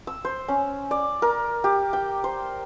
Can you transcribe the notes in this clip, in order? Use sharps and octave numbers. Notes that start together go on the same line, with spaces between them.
E6
C5
C#4
D5
A#4
G4
G5
C5